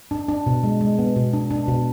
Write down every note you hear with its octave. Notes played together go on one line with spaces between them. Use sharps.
D4
D4
B2
G#3
G#3
B3
B2
D4
D4
B2